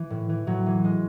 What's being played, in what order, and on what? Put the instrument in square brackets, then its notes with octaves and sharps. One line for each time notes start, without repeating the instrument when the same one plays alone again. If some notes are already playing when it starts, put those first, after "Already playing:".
Already playing: [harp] E3
A2
E3
A2 F#3
E3
G#3